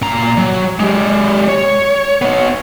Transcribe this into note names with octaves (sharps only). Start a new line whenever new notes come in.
A#2 A#5
F#3
G#3 G4
C#5
B3 C#5